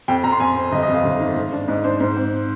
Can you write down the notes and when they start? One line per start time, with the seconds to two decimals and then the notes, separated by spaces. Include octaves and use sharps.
0.08 F2 G5
0.24 F2 A#5
0.32 C6
0.40 F2 G#5
0.56 C4
0.72 G1 D#5
0.82 D#5
0.88 F2
0.94 F5
1.04 G1
1.20 D#3
1.36 G#2
1.52 D4
1.68 G#2 D#5
1.84 D4 C5
2.00 G#2 C5
2.17 C4